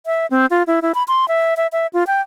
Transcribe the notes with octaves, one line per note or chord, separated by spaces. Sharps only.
E5
C4
F4
E4
E4
B5
C6
E5
E5
E5
F4
G5